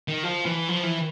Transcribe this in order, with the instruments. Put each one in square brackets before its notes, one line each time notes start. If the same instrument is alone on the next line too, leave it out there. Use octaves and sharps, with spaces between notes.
[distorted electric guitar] D#3
F3
E3
F3
E3